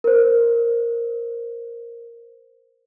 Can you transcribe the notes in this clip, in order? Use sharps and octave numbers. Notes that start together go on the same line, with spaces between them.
A#4 C5